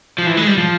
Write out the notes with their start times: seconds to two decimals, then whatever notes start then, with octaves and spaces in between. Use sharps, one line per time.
0.18 F3
0.26 E3
0.37 G#3
0.47 G3
0.58 F3